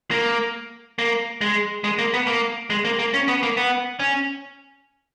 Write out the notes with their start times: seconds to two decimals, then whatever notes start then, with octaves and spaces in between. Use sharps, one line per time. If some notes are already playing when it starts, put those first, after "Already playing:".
0.11 A#3
0.99 A#3
1.41 G#3
1.84 G#3
1.99 A#3
2.14 B3
2.27 A#3
2.70 G#3
2.85 A#3
2.99 A#3
3.14 C#4
3.28 B3
3.43 A#3
3.57 B3
3.99 C#4